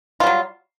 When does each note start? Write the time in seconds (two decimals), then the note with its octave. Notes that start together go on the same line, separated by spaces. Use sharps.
0.20 F4
0.23 G3
0.27 F#3